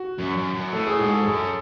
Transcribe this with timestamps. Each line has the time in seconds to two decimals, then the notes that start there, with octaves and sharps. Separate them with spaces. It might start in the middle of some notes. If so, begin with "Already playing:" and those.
Already playing: F#4
0.19 F#2
0.37 F#2
0.55 F#2
0.73 A2 A4
0.87 G#4
0.99 G#2 G#4
1.13 A4
1.23 F#2 G#4
1.34 A4